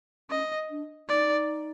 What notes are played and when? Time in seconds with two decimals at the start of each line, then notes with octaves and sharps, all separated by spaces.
0.30 C#4 D#5
0.70 D4
1.08 D#4 D5